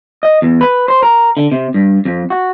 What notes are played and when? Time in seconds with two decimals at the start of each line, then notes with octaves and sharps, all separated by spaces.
0.23 D#5
0.42 E2
0.61 B4
0.88 C5
1.03 A#4
1.37 D3
1.52 C3
1.74 G2
2.05 F2
2.30 F#4